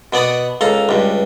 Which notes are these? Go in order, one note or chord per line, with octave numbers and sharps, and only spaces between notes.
B2 B3 D5 F#5 D#6
C#2 A4 F5 A#5
C#2 G2